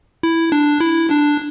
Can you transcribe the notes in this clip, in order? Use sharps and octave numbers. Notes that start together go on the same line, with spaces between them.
E4
D4
E4
D4